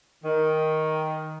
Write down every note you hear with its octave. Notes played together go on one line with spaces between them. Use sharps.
D#3